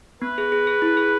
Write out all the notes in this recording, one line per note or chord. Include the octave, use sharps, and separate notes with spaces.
B3 B4
G#4
G#4
G#4
E4
G#4